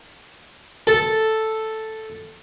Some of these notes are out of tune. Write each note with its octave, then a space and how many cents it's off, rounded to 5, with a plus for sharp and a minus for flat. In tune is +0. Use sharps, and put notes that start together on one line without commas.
A4 +0